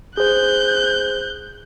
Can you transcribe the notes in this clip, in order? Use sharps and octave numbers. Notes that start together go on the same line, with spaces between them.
G#4 C5 F#6 G6